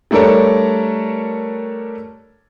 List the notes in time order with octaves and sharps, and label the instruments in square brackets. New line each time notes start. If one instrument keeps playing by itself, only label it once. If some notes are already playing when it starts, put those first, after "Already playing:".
[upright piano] G3 A3 D4 A4 A#4 C#5